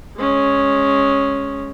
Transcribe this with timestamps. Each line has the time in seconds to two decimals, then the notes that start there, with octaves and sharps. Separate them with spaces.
0.17 G#3 C#4